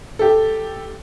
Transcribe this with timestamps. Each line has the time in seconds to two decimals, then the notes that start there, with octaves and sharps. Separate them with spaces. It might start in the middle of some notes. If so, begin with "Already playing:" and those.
0.19 G4 A4